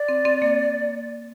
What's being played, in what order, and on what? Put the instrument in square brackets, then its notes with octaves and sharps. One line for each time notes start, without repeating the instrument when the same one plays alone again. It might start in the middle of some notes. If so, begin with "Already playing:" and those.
Already playing: [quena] D5
[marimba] C4
C4
A#3